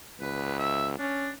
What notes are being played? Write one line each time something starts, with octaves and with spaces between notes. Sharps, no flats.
C#2 B4
E5
C#4 D4